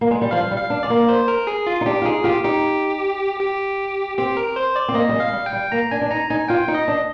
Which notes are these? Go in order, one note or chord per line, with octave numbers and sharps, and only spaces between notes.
A#3
G#3
G3
F3 F5
G3
F5
D4
G#3 D5
A#3
C5
A#4
G#4
F4
D#4
D4 G4
F4
D#4 G#4
F4 G4
D#4 G4
G4
C4 G4
A#4
C5
D5
C4
A#3 D#5
G3
G#3
F5
G3
G5
G3
A#3 A#5
D4 G#5
D4
D#4 A#5
D#4 G#5
F4 G5
D#4
D#5
D4